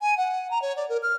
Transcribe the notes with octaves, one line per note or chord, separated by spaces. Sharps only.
G#5
F#5
A#5
C#5
D5
A#4
F6